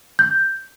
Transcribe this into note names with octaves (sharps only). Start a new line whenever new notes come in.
G6